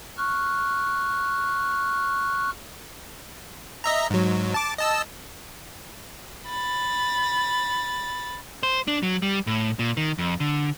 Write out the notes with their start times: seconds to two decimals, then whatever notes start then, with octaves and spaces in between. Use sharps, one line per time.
0.17 C#6 F6 F#6
3.84 D#5 E5 A#5
4.10 G#2 F#3
4.54 A5 D6
4.78 D#5 A5 E6
6.46 B5 A6
8.63 C5
8.88 D4
9.03 F#3
9.22 G3
9.47 A2
9.79 A#2
9.97 D#3
10.18 F2
10.40 D3